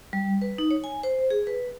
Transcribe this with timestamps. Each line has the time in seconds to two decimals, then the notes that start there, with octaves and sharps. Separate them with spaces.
0.13 G3
0.42 B4
0.58 D#4
0.71 C#5
0.84 G#5
1.03 C5
1.30 G#4
1.47 B4